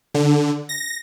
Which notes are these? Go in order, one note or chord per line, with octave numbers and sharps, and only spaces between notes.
D3
A#6